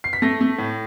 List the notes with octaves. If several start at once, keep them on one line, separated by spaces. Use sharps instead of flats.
C7
B6
A3 A#6
A3
A2